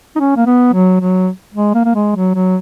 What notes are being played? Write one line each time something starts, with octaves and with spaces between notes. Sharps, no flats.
D#4
C#4
A#3
B3
F#3
F#3
G#3
A#3
A#3
G#3
F#3
F#3